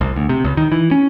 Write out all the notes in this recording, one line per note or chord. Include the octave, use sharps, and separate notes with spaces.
C2
D2
C3
C#2
D#3
E3
C#4